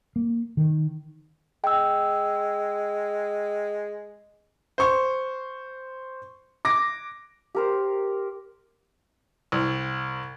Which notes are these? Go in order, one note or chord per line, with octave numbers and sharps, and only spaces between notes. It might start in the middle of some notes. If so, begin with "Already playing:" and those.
A#3
D#3
G#3 G5 E6
C5 C#6
D6 A#6
G4 A#4 C5
C2